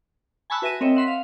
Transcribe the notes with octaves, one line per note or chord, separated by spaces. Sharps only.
G#5 A5 B5 C#6 E6 F#6
F#4 B4 E5 G#5 A#6 D#7
C4 A#4 C#5 D#5 E5 G5
E5 F#5 C6 B6
F5